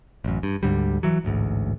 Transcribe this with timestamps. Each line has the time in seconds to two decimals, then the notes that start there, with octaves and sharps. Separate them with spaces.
0.24 A1 F#2
0.43 G2
0.63 D2 G#2 D3 G3
1.03 E3 F#3
1.25 A1 D2 G#2